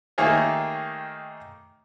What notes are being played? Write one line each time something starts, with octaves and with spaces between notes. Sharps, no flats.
D#3 A3 A#3 G4 G#4 C#5